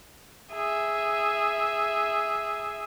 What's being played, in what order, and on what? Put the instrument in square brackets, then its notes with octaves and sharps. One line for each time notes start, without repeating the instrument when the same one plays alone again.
[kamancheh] G#4 E5